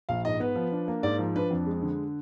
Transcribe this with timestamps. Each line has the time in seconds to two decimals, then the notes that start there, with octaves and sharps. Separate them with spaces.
0.09 A#1 F5
0.25 G#2 D#5
0.40 B3 B4
0.56 F3
0.72 D4
0.88 A#3
1.03 G#2 D5
1.19 F3
1.36 D4 B4
1.51 F2
1.66 G#3
1.82 D3